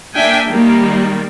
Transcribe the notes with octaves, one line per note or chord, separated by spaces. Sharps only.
A#3 D4 E5 G5 G#5
D#3 G3 A#3